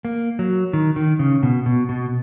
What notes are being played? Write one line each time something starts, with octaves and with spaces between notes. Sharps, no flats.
A#3
F#3
D#3
D#3
C#3
B2
B2
B2